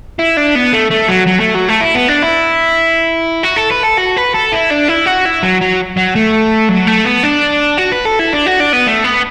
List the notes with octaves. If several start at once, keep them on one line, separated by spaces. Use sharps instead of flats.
E4
D4
B3
A3
A3
F#3
F#3
A3
F#3
A3
E4
B3
D4
E4
F#4
A4
B4
A4
F#4
B4
A4
E4
D4
E4
F#4
E4
F#3
F#3
F#3
A3
F#3
A3
B3
D4
F#4
B4
A4
E4
D4
F#4
D4
B3
A3
B3